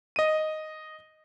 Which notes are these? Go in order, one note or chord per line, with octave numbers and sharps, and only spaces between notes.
D#5 D#7